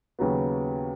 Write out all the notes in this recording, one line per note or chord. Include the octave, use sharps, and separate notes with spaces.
D#2 C#3 F#3 B3